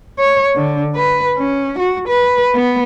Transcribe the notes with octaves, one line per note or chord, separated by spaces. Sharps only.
C#5
D3
B4
C#4
F#4
B4
B3